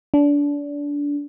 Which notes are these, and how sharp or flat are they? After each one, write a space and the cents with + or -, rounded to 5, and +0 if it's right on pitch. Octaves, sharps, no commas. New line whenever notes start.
D4 -25